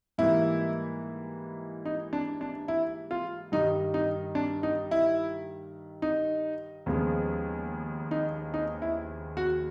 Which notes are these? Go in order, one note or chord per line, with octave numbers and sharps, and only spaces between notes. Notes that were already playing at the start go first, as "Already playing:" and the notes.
G#2 E3 G3 A#3 E4
D#4
D4
D4
E4
F4
G2 D#3 G3 D#4
D#4
D4
D#4
E4
D#4
D#2 C#3 F3 G#3 B3
D#4
D#4
E4
F#4